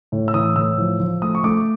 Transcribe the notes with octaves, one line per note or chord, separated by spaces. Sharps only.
A2
E6
E3 D#6
A2 E6
F3
F3
A3 D#6
C#6
A3 D6